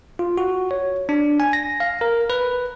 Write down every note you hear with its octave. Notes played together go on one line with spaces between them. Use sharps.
F4
F#4
C#5
D4
G#5
A#6
F5
A#4
B4